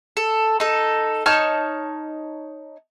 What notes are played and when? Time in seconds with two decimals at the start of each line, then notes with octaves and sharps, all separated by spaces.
0.17 A4
0.60 D#4 A4
1.26 D#4 C#5 A5 F6